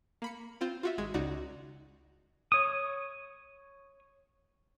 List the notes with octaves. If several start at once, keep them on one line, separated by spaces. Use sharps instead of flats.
A#3 B5 C#7
C4 F4 C5
F4 F#4 E5
G#1 G#3 G#6
C#2 D#4 F#4 D5 A#5
C#5 D#6